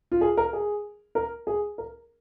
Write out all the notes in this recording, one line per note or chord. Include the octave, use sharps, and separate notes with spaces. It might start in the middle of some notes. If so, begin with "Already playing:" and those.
F4
G#4
A#4
G#4
A#4
G#4
A#4